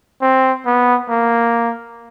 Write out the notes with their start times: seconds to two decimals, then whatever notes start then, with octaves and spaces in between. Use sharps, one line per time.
0.22 C4
0.66 B3
1.10 A#3